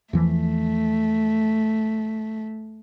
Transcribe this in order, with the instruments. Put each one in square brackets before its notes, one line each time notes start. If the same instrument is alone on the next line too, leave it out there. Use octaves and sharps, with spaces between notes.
[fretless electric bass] E2 E3 F3 [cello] A3